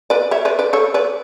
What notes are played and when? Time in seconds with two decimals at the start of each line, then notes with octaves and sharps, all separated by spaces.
0.10 B4 D5
0.31 C#5 E5
0.45 B4 D5
0.59 B4 D5
0.73 A4 C#5
0.94 B4 D5